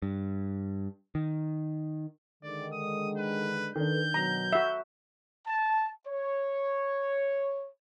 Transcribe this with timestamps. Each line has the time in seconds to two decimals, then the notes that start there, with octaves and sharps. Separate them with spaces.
0.02 G2
1.15 D#3
2.43 D3 D#3 G#3 D5
2.72 D#6
3.17 B4
3.76 D#3 D4 A4 B4 G6
4.14 B2 F#3 A#5
4.53 F#4 E5
5.47 A5
6.07 C#5